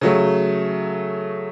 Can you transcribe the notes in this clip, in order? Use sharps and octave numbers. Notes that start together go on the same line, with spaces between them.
C#3 F#3 A3